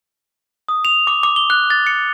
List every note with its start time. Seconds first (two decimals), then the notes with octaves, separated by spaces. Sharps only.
0.69 D#6
0.85 F7
1.07 D6
1.23 D6
1.36 G7
1.50 F#6
1.70 A6
1.87 C#7